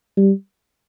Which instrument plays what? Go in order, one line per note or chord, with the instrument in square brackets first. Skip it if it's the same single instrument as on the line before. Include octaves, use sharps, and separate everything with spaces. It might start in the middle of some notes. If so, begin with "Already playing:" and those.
[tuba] G3